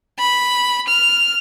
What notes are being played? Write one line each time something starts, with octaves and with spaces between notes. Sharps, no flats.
B5
F6